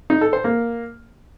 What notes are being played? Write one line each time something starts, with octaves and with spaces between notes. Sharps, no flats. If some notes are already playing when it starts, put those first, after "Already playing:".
D#4
A4
C5
A#3